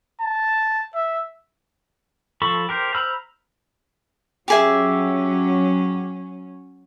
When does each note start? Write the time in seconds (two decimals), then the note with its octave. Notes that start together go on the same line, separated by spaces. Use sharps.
0.21 A5
0.95 E5
2.42 F3 A4 B5 C#6
2.69 G4 A#4 C5
2.94 C5 A#5 B5 E6 F6
4.48 F#3 C#4 G4 G#4 E5